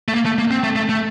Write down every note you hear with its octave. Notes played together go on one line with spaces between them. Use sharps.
A3
A#3
A3
A#3
C4
A3
A3
A3